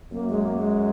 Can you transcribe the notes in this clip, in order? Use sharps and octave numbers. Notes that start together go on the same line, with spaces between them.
F#2 A#3
G#3
A#3
G#3